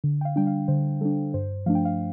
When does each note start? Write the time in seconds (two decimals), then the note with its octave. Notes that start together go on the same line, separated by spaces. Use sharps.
0.04 D3
0.21 G5
0.25 F5
0.36 G3 D4 G5
0.47 F5
0.68 D3 C5
1.01 G3 D4 A4
1.34 G2 C5
1.66 F3 A3 D4 F5
1.75 G5
1.85 F5